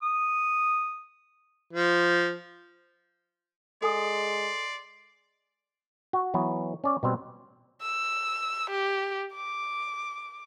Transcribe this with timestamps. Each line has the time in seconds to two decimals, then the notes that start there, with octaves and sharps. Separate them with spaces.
0.03 D#6
1.73 F3
3.82 G#3 A4 D5 G#5 C6 D#6
6.13 F#4
6.34 E3 F#3 B3
6.84 C#4 D5
7.03 B2 G3 C4
7.82 E6
8.70 G4
9.33 D6